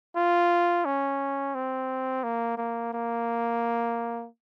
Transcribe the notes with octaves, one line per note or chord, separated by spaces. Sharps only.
F4
C#4
C4
A#3
A#3
A#3